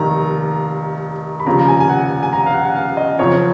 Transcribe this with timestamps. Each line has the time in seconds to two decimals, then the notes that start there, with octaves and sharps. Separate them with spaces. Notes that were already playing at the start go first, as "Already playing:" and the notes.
Already playing: F1 D#2 D#3 A#5
1.40 B5
1.46 F1 D#2 C#3 F3 A#5
1.59 A#5
1.68 G#5
1.80 G#5
1.89 F#5
2.23 G#5
2.33 A#5
2.46 F5
2.54 F#5
2.65 F#5
2.76 F5
2.97 D#5
3.19 F#1 F2 F3 C#5